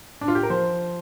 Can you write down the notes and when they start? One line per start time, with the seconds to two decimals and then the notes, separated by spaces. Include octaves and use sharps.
0.21 D4
0.28 F4
0.35 G4
0.43 A#4
0.50 F3 C5